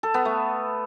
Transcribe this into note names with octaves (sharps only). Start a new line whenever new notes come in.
A4
B3
A3